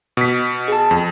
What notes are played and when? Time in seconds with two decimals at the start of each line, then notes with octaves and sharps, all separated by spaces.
0.17 B2 B6
0.68 G#4 A5
0.91 F2